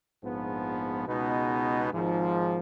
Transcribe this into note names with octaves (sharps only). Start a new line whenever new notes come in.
A#1 G#2 F3 B3
C#2 B2 G#3 B3 D#4
G#1 G#2 F3